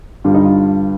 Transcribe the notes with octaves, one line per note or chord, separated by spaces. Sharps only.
G2 D3 G3 F4
D#4
F4